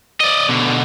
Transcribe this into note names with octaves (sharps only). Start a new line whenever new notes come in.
D5 D#5
B2 D3